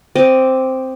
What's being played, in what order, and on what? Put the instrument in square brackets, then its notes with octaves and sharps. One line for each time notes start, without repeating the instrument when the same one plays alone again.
[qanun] C4 D5 D#5